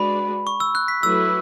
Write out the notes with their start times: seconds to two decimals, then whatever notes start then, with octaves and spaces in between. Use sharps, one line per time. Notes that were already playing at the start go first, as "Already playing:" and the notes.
Already playing: G#3 D4 F#4 B4 D5 B5
0.47 C#6
0.60 E6
0.75 F#6
0.88 B6
1.03 F#3 A3 E4 B4 E6